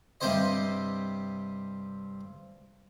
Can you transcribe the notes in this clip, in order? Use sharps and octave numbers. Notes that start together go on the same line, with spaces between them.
G2 C3 C4 G4 C5 D#5